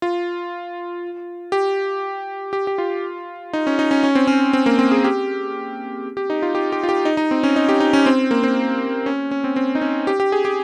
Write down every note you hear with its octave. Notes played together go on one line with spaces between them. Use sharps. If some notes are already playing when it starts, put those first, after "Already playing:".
F4
G4
G4
G4
F4
D#4
C#4
D#4
C#4
C#4
C4
C#4
C4
A#3
C4
G#4
G4
G4
D#4
F4
G4
G4
F4
G4
D#4
D#4
C4
C#4
D#4
G4
D#4
C#4
C4
A#3
C4
C#4
C#4
C4
C4
D#4
C#4
G4
G4
G#4
G4